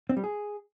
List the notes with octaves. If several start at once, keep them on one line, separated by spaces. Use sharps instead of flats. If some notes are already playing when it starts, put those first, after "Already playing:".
C4
G3
G#4